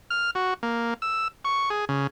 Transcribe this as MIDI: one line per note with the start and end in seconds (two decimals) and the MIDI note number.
0.10 0.31 89
0.35 0.54 66
0.63 0.94 58
1.02 1.28 88
1.45 1.70 85
1.70 1.85 68
1.89 2.07 49